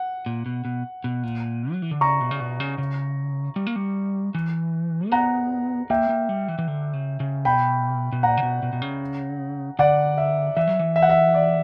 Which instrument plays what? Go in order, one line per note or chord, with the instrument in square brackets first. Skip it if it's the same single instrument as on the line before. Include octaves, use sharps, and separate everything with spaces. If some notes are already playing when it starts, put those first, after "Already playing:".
Already playing: [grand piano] F#5
[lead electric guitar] A#2
B2
B2
B2
A#2
F#3
E3
D3
[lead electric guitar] C#3 [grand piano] A#5 C#6
[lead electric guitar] B2
C#3
B2
C#3
C#3
G3
A#3
G3
E3
A#3
[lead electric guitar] B3 [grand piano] F#5 A#5
[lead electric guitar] A#3 [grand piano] E5 G5
[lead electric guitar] A#3
G3
E3
E3
D3
C#3
C#3
[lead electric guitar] B2 [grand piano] G5 B5
[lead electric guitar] B2
[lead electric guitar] A#2 [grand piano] F#5 A#5
[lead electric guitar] C#3
B2
B2
B2
C#3
[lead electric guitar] D3 [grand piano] D5 F#5
[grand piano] E5
[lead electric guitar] E3 [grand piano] E5
[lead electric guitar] F#3
E3
[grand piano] E5
F#5
E5
D5